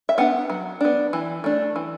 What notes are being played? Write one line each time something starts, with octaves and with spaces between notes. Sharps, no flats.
E5
B3 D4 F#5
F#3
B3 D4
E3
A3 D4
E3